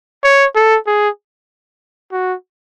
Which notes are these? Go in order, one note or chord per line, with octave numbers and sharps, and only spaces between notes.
C#5
A4
G#4
F#4